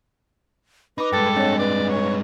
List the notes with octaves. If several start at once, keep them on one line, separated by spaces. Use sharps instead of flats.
D#4 B4 B5 D6
G2 G#3 A4 G5 A6
C4 D4 C#5 D#5
B4 D5
C#5